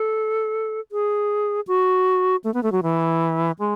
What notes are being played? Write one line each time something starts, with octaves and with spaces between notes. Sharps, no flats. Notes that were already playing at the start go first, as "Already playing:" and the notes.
Already playing: A4
G#4
F#4
A3
B3
A3
F#3
E3
G#3